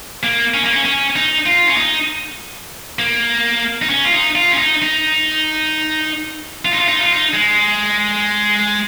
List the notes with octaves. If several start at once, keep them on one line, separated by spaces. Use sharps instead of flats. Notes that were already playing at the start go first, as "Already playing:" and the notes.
A#3
C#4
A#3
C#4
C#4
D#4
F4
C#4
D#4
A#3
D#4
C#4
F4
D#4
F4
C#4
D#4
D#4
F4
D#4
F4
D#4
F4
D#4
G#3